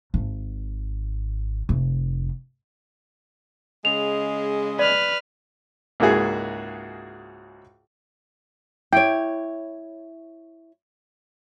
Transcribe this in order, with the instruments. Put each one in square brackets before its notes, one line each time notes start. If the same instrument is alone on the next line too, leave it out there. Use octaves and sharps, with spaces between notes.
[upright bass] G#1
F1
[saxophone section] C#3 G#3 [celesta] F7
[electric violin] B4 F6 [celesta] D5
[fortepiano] C#2 G#2 A#3 E4 F#4 G#4
[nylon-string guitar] E4 C#5 [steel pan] G5